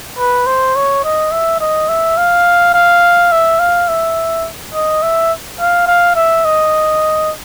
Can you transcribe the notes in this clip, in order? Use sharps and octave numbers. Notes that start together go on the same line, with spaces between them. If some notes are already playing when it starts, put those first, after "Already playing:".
B4
C5
C#5
D#5
E5
D#5
E5
F5
F5
E5
F5
E5
D#5
E5
F5
F5
E5
D#5